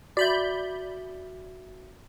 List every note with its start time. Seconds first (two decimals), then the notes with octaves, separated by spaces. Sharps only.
0.17 F#4 D5 E5 B5 G6